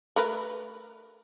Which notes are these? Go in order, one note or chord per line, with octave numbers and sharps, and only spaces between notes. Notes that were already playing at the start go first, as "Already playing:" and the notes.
A3 A#4 B4